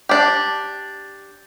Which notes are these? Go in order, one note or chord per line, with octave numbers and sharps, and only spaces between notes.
D4 G4